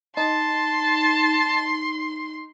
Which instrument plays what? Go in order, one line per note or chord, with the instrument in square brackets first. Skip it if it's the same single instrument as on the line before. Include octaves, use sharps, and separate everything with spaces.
[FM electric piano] D#4 [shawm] A5 [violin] C6